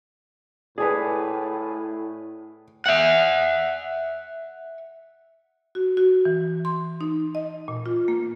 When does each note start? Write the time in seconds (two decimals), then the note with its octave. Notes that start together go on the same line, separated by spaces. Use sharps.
0.78 A2 G#4 B4 D5 G#5
2.86 E5 F#5
5.75 F#4
5.97 F#4
6.25 E3
6.65 C6
7.01 D#4
7.35 D#5
7.68 A#2
7.86 F4
8.08 A#3